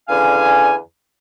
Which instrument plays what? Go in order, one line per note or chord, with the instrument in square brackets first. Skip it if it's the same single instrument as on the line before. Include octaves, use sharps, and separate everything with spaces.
[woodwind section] E2 D3 C#4 F5 G#5